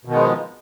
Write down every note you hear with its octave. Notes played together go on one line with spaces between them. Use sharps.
B2 D#3 F3 G#3 B3